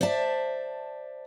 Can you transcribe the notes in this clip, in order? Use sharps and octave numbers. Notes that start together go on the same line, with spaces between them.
C5 D5 E5 A5